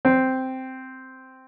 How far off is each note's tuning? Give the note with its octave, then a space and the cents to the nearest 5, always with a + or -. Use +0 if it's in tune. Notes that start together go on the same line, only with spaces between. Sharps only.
C4 -5